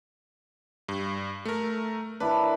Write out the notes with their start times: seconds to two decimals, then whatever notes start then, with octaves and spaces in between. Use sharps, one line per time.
0.89 G2
1.45 A3 A#4
2.20 D4 E4 A#4 B4